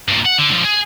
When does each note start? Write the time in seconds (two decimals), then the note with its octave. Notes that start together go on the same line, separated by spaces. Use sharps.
0.08 G2 A#2
0.26 F#5
0.39 D3
0.52 D3 F3
0.65 G#4